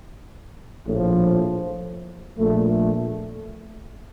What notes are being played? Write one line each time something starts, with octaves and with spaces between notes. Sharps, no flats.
A#1 A2 F3
A#1 A#2 A3